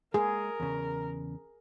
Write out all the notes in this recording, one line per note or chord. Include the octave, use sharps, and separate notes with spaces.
G#3 A#3 G#4 A#4
E2 C#3